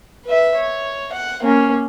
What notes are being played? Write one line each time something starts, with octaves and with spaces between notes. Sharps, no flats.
B4 E5
C#5
F#5
A#3 C#4